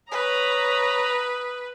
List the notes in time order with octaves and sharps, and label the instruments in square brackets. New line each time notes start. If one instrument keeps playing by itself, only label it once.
[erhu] B4 [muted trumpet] C#5 [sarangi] A#5 [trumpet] D#6